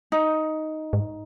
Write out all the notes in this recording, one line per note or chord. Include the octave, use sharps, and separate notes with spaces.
D#4
G#2